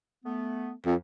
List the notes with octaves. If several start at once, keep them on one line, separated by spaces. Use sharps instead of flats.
A3 B3
F2